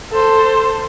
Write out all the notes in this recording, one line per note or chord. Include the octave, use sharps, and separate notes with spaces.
A4 C5